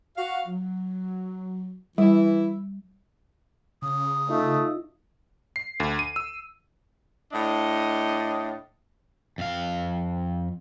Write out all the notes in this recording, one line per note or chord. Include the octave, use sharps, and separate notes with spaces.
F#4 F5
F#3
E3 G3 E4
C#3 D#6
A3 D#4 F4
C7
D2
D#7
E6
A2 D4 D#5
F2 F5